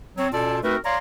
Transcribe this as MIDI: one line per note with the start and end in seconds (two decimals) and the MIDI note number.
0.17 0.27 54
0.17 0.27 60
0.17 0.27 73
0.32 0.58 47
0.32 0.58 61
0.32 0.58 65
0.32 0.58 69
0.32 0.58 74
0.32 0.58 81
0.63 0.76 57
0.63 0.76 60
0.63 0.76 63
0.63 0.76 66
0.63 0.76 70
0.63 0.76 71
0.84 0.98 73
0.84 0.98 74
0.84 0.98 77
0.84 0.98 82
0.84 0.98 84